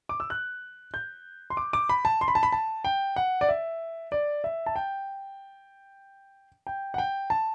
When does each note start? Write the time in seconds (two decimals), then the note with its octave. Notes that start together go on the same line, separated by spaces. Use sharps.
0.09 D6
0.20 E6
0.30 F#6
0.94 G6
1.50 C6
1.57 D6
1.73 D6
1.89 B5
2.05 A5
2.21 C6
2.28 B5
2.35 A5
2.43 B5
2.52 A5
2.85 G5
3.16 F#5
3.41 D5
3.49 E5
4.12 D5
4.44 E5
4.66 A5
4.76 G5
6.67 G5
6.94 F#5
6.98 G5
7.30 A5